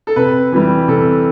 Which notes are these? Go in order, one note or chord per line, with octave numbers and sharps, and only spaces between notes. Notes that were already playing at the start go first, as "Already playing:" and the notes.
A4
C3 B4
E3 G3
C3 A4